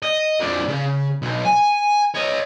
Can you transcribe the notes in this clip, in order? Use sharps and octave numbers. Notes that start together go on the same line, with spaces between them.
D#5
F2 D4
C#3
B1
G#5
C#5 D#5